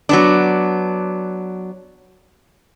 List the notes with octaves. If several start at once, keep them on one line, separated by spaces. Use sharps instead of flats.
F#3 B3 D4